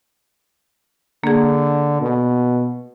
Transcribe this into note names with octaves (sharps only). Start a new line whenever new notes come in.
D3 A#3 G#4
B2